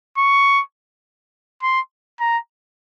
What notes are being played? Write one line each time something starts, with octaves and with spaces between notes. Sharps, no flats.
C#6
C6
A#5